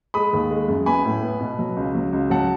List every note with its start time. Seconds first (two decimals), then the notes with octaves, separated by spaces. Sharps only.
0.14 G#3 B5 D#6
0.33 D#2
0.51 G#3
0.68 F#2
0.86 B3 G#5 B5
1.05 A2
1.23 B3
1.41 B2
1.59 F#3
1.77 C#2
1.95 F#3
2.13 C#2
2.30 F#3 F#5 A5